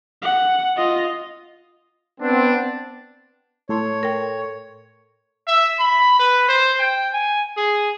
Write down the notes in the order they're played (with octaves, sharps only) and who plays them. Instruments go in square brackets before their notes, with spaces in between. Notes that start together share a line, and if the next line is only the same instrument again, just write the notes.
[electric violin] F#5
F4 D#5
[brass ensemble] B3 C4 [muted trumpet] D4
[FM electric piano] A2 A4 C6 [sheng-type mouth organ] C#5
[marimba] A#4 G5
[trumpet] E5
B5
B4
C5
G5
G#5
G#4